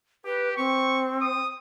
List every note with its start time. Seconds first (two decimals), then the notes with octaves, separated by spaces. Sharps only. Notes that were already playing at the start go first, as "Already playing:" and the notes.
0.25 G4 B4
0.57 C4 C#6
1.21 D#6